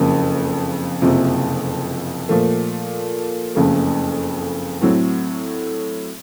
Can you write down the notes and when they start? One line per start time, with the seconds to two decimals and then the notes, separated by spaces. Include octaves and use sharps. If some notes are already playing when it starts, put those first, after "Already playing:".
Already playing: F#1 F2 C#3 F3 A#3
1.02 F#1 F2 C3 F3
2.29 A#2 F3 A3
3.55 F#1 F2 C#3 A3
4.82 A2 F#3 A3 C4